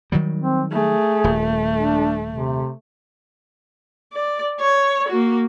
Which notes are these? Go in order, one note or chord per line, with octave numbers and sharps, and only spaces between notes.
D#3 F#3 G3
C4
A3 G#4
D#1
D4
C3
D5
C#5
A#3 F#4